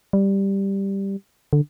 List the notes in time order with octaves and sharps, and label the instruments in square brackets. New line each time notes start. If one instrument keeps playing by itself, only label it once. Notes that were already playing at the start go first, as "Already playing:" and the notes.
[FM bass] G3
D3